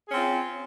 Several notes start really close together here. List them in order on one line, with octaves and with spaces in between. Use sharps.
G#4 C#4 C4 F4